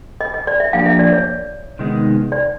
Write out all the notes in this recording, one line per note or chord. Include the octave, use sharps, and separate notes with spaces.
D#5
D#5
D5
E5
F3 A#3 D4 G4 F5
E5
D5
C#5
C3 D#3 G#3 B3 D#4
D5